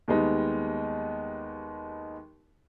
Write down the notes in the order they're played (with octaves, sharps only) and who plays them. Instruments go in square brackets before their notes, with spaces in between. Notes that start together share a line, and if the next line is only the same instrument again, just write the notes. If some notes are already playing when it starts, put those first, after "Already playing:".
[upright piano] D#2 G3 G#3 B3 D#4